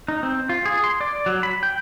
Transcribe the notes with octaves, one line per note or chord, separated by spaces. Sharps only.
D#4
C4
F4
G#4
C6
D5
F#3
B5
G5